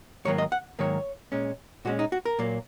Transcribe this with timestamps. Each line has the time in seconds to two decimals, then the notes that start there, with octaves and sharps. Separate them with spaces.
0.25 G#2 D#3 F#3 A#3 C#5
0.38 D#5
0.52 F#5
0.79 G#2 D#3 F#3 A#3 C#5
1.32 A#2 G#3 C#4
1.85 A#2 G#3 C#4 F#4
1.99 D#4
2.12 F#4
2.25 A#4
2.39 A#2 F#3 A#3